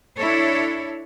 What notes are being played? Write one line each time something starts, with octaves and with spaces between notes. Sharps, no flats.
D4 E4 A4 C#5